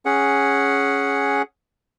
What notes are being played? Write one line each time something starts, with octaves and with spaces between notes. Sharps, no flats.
C#4 G#4 F#5